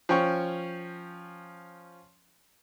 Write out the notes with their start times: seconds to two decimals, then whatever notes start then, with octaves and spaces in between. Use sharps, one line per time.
0.09 F3 C#4 G5 C#6